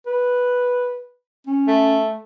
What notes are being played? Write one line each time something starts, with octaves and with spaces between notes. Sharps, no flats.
B4
C#4
A3